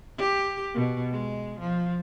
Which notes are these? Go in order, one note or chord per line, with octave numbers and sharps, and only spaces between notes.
G4
B2
G#3
F3